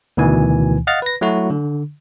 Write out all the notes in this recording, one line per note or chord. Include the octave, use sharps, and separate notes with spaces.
D2 B2 D#3 E3 G#5
D#5 F5 F#5 F6 A6
B4 A#6
F#3 A3 E4 F#4
D3